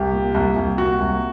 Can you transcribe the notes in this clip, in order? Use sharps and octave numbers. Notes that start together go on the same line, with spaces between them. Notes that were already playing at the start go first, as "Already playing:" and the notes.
Already playing: C2 G4
A#2
C2
C2
A#2 F#4
C2